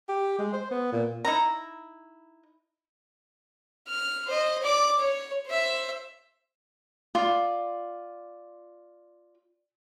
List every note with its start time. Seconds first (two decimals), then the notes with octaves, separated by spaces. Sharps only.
0.09 G4
0.39 G#3
0.53 C5
0.71 B3
0.92 A#2
1.25 D#4 E4 A#5
3.88 F6
4.27 C5 D#5
4.63 D5 D6
5.00 C#5
5.47 C5 E5
7.15 F4 D5